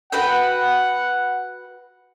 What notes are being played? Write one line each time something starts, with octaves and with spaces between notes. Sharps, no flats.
F#4 B4 F#5 G5